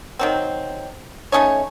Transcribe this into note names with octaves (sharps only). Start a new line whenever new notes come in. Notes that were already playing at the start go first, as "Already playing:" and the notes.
D#3 F#3 C4
A3 C#4 D#4 C#5